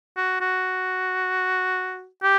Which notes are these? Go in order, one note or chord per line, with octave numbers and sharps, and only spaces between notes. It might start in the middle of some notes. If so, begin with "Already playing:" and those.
F#4
F#4
G4